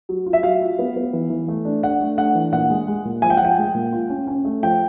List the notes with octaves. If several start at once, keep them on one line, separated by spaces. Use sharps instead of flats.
F#3
F4
E5
F#3 F5
F4
B3
B3
E3
E3
A3
D4
D4 F#5
A3
D4 F#5
E3
A#2 F#5
G#3
G#3
A#2
F3 G#5
G5
F#5
F3 G5
G#3
A#2
F4
C#4
C#4
A3
F3 G5